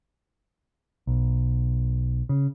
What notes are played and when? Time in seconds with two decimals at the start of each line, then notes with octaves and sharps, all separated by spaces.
1.07 B1
2.29 C#3